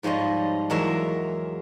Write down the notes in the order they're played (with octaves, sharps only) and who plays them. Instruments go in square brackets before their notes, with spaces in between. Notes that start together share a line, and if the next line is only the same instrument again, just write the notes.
[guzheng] G#2 F3 G3 C#5 D#5
E2 F#3 G#3 A#4 C#5 E5